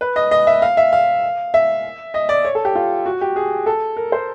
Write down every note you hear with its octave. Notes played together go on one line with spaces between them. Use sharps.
B4
D#5
D#5
E5
F5
E5
F5
E5
D#5
D5
C#5
A4
G4
F4
F#4
G4
G#4
A4
A#4
C5